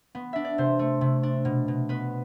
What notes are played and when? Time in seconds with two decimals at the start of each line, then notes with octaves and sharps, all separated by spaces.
0.15 B3
0.33 D4 E5
0.45 D5
0.58 C3 C5
0.79 A3
1.01 C3
1.23 D4
1.45 B2
1.68 B2
1.89 B3 B4